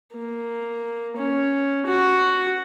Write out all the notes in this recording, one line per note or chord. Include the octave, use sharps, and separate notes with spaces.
A#3
C#4
F#4